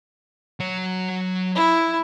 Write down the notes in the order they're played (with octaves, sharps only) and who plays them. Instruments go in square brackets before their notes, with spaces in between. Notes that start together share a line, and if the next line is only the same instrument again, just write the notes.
[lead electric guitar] F#3 C#5
[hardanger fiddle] E4